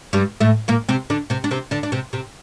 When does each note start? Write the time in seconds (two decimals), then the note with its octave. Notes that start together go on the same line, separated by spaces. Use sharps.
0.13 G2 G3
0.41 A2 A3
0.68 A#2 A#3
0.89 C3 C4
1.10 D3 D4
1.30 C3 C4
1.44 D4
1.51 C3 C4
1.71 D3 D4
1.83 D4
1.92 C3 C4
2.13 C3 C4